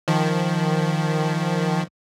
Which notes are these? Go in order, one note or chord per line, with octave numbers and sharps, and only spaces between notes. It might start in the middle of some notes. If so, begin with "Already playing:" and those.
D#3 F3